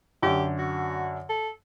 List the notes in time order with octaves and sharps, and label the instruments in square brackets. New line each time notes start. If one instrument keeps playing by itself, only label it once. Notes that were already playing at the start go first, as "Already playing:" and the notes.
[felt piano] F#2 D3 [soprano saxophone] G4
[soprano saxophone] F#4
A4